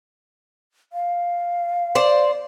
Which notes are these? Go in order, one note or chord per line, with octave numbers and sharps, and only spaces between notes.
F5
C5 D5